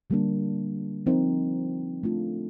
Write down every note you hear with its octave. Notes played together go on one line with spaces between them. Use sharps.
D3 G3 A#3 D4
F3 C4 D#4 A#4
A3 D4 F4